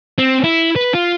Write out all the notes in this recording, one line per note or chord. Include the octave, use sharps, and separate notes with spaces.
C4
E4
B4
F4